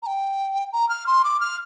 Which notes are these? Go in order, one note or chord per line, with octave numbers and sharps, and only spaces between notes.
A#5
G5
A#5
F6
C6
D6
F6